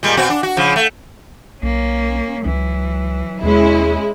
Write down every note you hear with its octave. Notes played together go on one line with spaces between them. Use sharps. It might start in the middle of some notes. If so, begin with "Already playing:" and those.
A#2 G3 G#3
B2 C4 F#4
D4
F#4
C#3 F3
A3
B1 A#3 C#4
C#2 E3 F#3
D#2 B2 G#3 C#4 E4